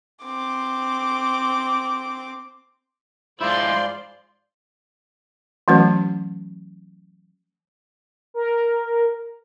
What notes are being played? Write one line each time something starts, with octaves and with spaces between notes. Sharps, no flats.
C4 D6
G#2 F3 G#3 E4 F4 C5 D5 C6
E3 F#3 A3 C#4 F#4 B4
A#4